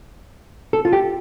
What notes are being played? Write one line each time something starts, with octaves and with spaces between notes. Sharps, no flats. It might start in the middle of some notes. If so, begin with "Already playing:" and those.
A4
F4
G4